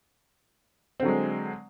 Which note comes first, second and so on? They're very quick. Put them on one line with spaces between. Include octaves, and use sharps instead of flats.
C4 D3 F#3 G#3